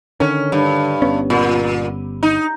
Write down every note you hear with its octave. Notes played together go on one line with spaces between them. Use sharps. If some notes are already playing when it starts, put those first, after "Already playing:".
D3 D#3 C#4
G2
G1 B3 C#4
A#2
D#4